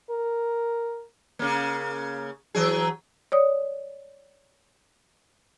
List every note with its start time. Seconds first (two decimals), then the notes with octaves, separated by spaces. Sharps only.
0.11 A#4
1.39 C#3 A#3
2.55 E3 F#3 G#4
3.32 C#5 D5 D#6